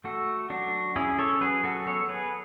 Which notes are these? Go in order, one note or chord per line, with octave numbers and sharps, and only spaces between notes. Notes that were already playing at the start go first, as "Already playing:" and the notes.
A3 F#4 A4
F#3 D4 F#4
C#4 E4 G#4
A4 C#5
F#3 G#4 B4
F#4 A4
B3 A4 C#5
G#4 B4